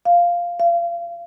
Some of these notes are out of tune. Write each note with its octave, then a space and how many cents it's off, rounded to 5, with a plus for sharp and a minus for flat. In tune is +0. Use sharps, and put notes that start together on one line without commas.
F5 -5
F5 -30